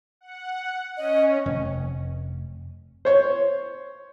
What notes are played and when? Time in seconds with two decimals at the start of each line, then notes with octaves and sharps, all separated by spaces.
0.21 F#5
0.98 C#4 D#5
1.46 F1
3.05 C5 C#5